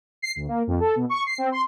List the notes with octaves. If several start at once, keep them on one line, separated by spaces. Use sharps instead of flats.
C7
D2
A#3
F2
A4
B2
C#6
C7
C4
C6